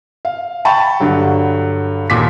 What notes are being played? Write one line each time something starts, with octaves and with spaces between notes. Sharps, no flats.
F5
G5 A5 B5 C#6
G2 D3 F#3
D#2 A#2 D6 B6